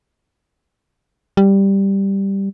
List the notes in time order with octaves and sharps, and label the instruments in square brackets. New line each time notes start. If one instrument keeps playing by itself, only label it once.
[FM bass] G3